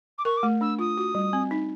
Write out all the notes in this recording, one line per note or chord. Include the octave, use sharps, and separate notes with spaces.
D6
A#4 C#6
D6
A3
D4 E6
F4 D#6
F#4
G3
C4
D#4